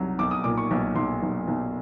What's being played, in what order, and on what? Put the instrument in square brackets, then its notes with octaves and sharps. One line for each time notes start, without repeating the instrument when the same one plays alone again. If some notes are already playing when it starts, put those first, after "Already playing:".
Already playing: [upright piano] C2 F#3
B1 D6
D#6
A#2 D6
C#6
B1
B1 C6
B1
B1